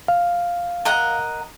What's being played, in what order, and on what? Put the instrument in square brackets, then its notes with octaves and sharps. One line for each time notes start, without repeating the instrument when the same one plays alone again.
[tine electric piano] F5
[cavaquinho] A#4 D#5 F#5